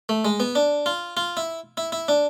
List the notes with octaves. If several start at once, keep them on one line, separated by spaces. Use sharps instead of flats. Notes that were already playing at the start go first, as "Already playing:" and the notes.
A3
G#3
B3
D4
F4
F4
E4
E4
E4
D4